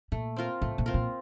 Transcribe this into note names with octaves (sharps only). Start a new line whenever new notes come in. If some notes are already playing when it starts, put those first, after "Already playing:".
A#2 A3
C4 F4 A#4
A2 A3
A#2
C4 F4 A#4
A#2